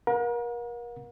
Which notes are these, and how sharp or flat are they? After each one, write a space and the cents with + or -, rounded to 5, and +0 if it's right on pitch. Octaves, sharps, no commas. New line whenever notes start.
A#4 +35 F#5 -45